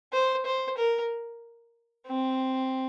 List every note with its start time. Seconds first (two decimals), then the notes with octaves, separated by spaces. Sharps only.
0.13 C5
0.45 C5
0.77 A#4
2.07 C4